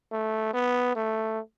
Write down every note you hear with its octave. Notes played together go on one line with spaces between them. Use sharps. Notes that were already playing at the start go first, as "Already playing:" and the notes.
A3
B3
A3